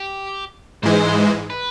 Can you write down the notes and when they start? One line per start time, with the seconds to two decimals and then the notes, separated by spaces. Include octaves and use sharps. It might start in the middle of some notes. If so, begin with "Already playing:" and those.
Already playing: G4
0.83 G#2 E3 G#3 C5
1.50 B4